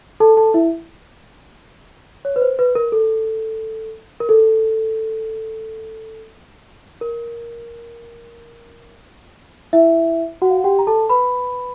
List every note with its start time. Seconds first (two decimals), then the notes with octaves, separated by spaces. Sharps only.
0.20 A4 A5
0.37 A4 A5
0.54 E4 E5
2.25 C#5
2.36 B4
2.42 C5
2.59 B4
2.75 A#4
2.92 A4
4.20 A#4
4.29 A4
7.01 A#4
9.73 E4 E5
10.42 F#4 F#5
10.50 F5
10.58 F#5
10.64 G4 G5
10.79 A#5
10.87 A4 A5
11.09 B4 B5